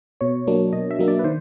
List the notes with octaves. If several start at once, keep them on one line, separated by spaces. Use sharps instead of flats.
B2 C#5
F#3 A#3 D4
B2 D#5
E5
F#3 A#3 D4
D5
B4
D#3 C5